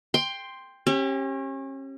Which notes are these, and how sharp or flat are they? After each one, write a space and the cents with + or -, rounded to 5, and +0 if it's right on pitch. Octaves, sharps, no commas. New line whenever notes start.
G5 +15 C6 +0
C#4 -35 G4 +0